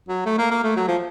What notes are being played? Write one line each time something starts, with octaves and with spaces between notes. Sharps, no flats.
F#3
A3
A#3
A#3
A3
F#3
F3